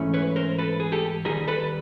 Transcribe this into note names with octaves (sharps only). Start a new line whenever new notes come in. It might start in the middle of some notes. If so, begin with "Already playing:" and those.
Already playing: G#2 E3 A3 C#4
B4 C#5
A#4 C5
A4 B4
G#4
G4 A4
D#2 D#3 G3 G#4 A#4
A4 B4